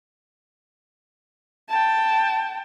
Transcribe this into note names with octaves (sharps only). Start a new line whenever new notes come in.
G5 A5